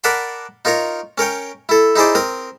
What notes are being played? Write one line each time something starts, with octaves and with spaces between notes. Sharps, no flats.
A#4 D5 F#5 A5 B5 C6
D#4 F4 A#4 C#5 A#5
C#4 A#4 C#5 G5
E4 A4
D#4 E4 G#4 C5 D5
C4 A#4 D#6